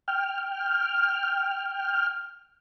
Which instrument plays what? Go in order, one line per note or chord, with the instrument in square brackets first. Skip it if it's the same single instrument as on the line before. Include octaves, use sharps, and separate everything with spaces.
[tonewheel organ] G5 F6